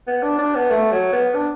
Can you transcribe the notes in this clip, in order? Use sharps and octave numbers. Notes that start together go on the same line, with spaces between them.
B3
D4
D4
B3
A3
F#3
B3
D4